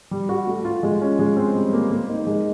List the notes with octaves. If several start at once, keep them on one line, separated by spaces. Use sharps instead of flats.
G3
F#4
A3
F4
G#3
C#4
G#3
C4
G3
A#3
A#3
D#4
G#3